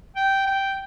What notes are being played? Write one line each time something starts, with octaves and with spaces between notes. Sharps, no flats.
G5
G5